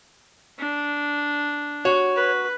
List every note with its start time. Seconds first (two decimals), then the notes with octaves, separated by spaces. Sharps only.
0.59 D4
1.85 F#4 C#5
2.16 B4